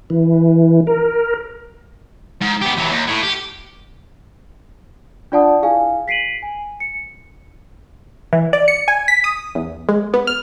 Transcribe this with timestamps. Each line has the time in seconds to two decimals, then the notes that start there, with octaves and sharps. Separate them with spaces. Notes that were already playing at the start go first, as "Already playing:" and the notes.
0.10 E3
0.87 A#4
2.41 G#2
2.61 B3 G4
2.77 E3 F#3
2.90 D#2
3.08 A2
3.23 G4
5.32 D4 F4 D5 F#5 A5 D#6
5.62 E4 G#4 F5 G#5
6.08 B6 C7 D7 D#7 F#7
6.42 G#5
6.80 C#7
8.33 E3
8.53 D5
8.68 C#7
8.88 G#5
9.08 B6
9.24 D#6
9.55 E2
9.89 G#3
10.14 B3
10.27 F6